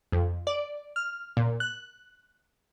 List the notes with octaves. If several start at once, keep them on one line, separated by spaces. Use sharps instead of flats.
F2
D5
F6
A#2
F#6